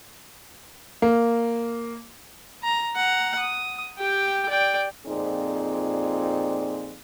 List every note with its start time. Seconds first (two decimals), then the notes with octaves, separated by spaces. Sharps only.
1.02 A#3
2.63 A#5
2.95 F#5 A#5
3.39 D#6
3.98 G4 G5
4.49 D5 G5
5.07 F2 A#2 C4 D#4 G#4 D5